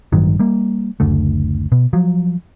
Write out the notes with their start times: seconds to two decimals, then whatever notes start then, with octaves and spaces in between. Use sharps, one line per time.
0.12 A1 G2 D#3 F#3
0.39 G3 A#3
1.00 F#1 D2 A3
1.72 B2
1.93 F3 F#3